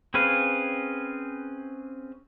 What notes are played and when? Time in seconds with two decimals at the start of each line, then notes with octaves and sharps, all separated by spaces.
0.14 C4 C#4 G#4 B4 F5